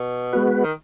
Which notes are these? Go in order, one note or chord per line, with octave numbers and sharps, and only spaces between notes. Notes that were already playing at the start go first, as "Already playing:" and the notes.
Already playing: B2
G#3 B3 F#4 B4
D#3